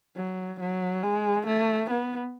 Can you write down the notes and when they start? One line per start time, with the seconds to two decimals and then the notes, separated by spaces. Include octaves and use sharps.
0.16 F#3
0.60 F#3
1.03 G#3
1.47 A3
1.90 B3